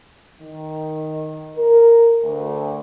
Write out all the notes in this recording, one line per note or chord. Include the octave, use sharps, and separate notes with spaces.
D#3
A#4
D2